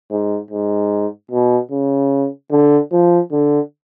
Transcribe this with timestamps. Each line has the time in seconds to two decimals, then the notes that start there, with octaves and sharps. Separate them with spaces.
0.11 G#2
0.51 G#2
1.31 B2
1.71 C#3
2.51 D3
2.92 F3
3.32 D3